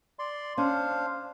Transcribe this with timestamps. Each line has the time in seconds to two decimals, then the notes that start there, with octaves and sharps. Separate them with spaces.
0.19 D5 C6
0.58 C#4 D4 C5 F5